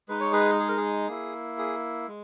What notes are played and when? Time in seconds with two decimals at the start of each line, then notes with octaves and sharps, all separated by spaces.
0.09 G#3 D#4 B4
0.20 C#5
0.33 G#4 B4
0.59 G#4
0.68 A#4
0.77 G#4
1.08 A#3 E4
1.58 G#4
2.08 G#3